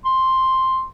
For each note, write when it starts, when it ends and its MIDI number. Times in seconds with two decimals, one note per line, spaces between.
0.05 0.85 84